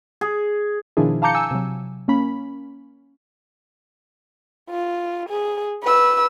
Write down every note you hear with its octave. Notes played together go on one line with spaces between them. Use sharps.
G#4
B2 D#3 F3 D4 E4 G#4
F5 A5 A#5 D6 G6 C#7
G#5 E6
C3 F#3
A#3 C#4 B5
F4
G#4
B4 E6